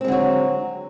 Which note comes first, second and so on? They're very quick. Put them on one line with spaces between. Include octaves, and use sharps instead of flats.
C4 G#3 D3 F#3